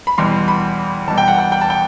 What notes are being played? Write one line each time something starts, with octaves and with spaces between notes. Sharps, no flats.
B5
E2 B2 G3 C6
B5
E2 B2 G3 A5
G5
F#5
G5
G5
A5
G5